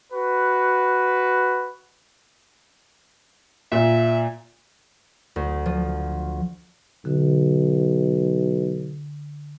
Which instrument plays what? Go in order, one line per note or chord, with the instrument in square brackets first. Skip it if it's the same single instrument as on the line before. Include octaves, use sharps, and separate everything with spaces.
[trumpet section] F#4 B4
[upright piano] A#2 [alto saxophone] E5
[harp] D2
F3
[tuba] B1 [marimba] D3